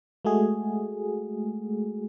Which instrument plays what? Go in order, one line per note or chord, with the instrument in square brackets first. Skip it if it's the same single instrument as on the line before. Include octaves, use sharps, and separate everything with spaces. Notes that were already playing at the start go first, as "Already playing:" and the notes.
[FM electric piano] G#3 A3 F#4 G#4